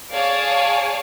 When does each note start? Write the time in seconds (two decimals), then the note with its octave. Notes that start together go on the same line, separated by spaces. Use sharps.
0.13 G#4 C#5 D5 F5 A5